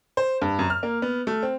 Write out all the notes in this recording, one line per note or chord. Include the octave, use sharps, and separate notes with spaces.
C5
G2
F#2
F6
A#3
B3
A3
C4